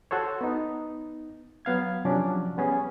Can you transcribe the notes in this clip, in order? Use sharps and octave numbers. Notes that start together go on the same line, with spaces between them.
F#4 A4 C5 C#5
B3 D#4
F#3 B3 F5 G#6
C3 F3 F#3 C#4 D4
G3 B3 C#4 G#4